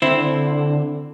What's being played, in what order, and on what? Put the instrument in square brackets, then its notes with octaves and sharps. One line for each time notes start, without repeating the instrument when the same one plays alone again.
[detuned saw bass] D3 [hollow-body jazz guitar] C4 E4